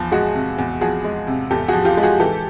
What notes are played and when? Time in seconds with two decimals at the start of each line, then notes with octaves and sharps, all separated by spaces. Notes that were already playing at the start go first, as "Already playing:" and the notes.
Already playing: E2 F3
0.12 G#3 F#4 G#4
0.34 C3
0.58 E2
0.81 F3 F#4 G#4
1.04 G#3
1.27 C3
1.50 E2 G4 A4
1.68 F3 F#4 G#4
1.85 F4 G4
1.97 G#3
2.03 F#4 G#4
2.20 E3 G4 A4